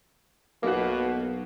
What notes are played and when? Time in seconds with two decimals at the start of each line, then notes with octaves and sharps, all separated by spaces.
0.63 B1 B2 A#3 F#4